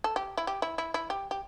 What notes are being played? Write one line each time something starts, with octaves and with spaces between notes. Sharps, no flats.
A4
G4
E4
G4
E4
E4
E4
G4
G4